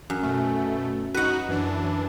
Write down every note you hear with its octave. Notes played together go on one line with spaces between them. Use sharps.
F#2
B2 A3
D#4 F#4 B4 F#5
F#2 E3 D4